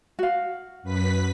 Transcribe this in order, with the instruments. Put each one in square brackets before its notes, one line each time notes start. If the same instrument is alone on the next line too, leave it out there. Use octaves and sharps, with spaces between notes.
[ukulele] F#4 F5
[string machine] F#2 B4 B6